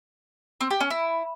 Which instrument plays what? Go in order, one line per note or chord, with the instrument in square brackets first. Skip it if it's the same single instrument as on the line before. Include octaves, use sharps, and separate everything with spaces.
[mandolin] C4
G4
C#4
E4